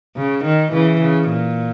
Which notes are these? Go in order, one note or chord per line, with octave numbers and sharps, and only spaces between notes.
C#3
D#3
C#3 E3
C#3
A#2